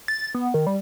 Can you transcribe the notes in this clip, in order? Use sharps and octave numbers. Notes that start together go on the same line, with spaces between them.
A6
B3
D#3
G3